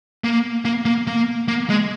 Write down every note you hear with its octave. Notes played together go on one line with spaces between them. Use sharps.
A#3
A#3
A#3
A#3
A#3
G#3